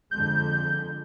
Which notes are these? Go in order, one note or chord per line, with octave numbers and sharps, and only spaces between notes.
F2 D3 G#3 G6